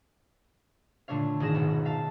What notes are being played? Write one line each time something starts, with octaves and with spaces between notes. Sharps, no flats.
A#2 D3 A3 D4 C#5 F5
G#1 D#3 G#4 A#6 E7
D#1 G#1 B2 B3
E5 F5 A5